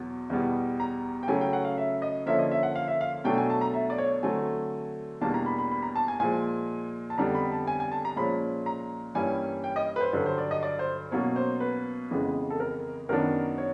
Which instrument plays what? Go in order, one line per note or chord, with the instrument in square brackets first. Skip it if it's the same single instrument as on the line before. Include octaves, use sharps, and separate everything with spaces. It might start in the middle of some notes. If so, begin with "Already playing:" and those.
Already playing: [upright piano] E2 B2 F#3 B3
E2 B2 G3 B3
A#5
G5
C#3 F#3 A3 C#4 G#5
G5
F#5
F5
E5
D#5
D3 F3 A#3 C#4 E5
D#5
E5
F#5
F5
E5
F5
B2 F#3 A3 D4 G5
G#5
A5
A#5
E5
D5
C#5
D3 F#3 A3 C4 G#5
E2 B2 G3 A#3 D4 A5
A#5
B5
B5
B5
A#5
A5
G#5
A#2 F3 G#3 G#5
A5
F2 D3 G3 B3 D4 A#5
B5
A5
G#5
G#5
A5
A#5
A#2 F3 G#3 C#4 B5
A#5
G2 E3 G3 A#3 C#4 G#5
G5
D#5
B4
C5
G2 D3 F#3 B4
C5
D5
D#5
D5
C5
B2 F#3 A#3 C#4 C#5
C5
B4
F2 C#3 E3 G#3 B3
A4
A#4
F#2 D#3 F#3 B3 D4 A#4
C#5